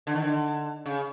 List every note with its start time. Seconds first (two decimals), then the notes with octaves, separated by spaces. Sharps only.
0.07 D3
0.15 D#3
0.22 D3
0.86 C#3